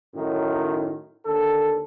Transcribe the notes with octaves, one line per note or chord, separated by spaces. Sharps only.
F#2 A2 D#3
D#2 D3 A4